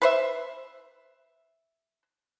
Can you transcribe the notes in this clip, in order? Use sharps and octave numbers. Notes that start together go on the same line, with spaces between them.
B4 C5 E5